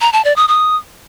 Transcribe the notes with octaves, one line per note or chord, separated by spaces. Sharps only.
A#5
A5
D5
D#6
D#6